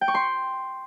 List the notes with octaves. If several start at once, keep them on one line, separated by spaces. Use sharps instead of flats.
G5
C#6
C6